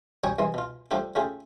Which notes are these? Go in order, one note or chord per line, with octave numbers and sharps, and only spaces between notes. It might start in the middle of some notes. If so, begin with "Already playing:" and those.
F#3 G3 C#5 G5 G#5 D#6
C2 E3 G#3 C6
B2 F4
F3 G3 A3 D4 F4 G4
C#3 A3 F4 G4 G#4